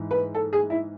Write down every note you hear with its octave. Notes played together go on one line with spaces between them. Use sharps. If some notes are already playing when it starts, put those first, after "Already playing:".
Already playing: G#2 E3
B4
A4
G#4
E4